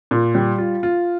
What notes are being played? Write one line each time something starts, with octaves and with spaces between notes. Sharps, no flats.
A#2
G3
F4
F4